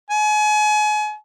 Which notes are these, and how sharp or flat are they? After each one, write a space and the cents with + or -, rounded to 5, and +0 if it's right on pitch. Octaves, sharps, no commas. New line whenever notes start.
G#5 +35